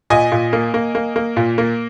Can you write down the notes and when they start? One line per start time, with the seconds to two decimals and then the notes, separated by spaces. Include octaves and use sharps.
0.10 A#2 D#5 G#5
0.32 A#2
0.53 A#3
0.74 A#3
0.95 A#3
1.16 A#3
1.37 A#2
1.58 A#3